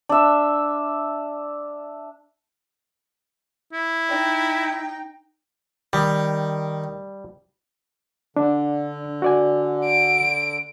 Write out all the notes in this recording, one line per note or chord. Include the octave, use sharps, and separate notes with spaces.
D4 E5
E4
D#4 G5
D#3 G3
D3 D4
F#4 D5 G#5
D7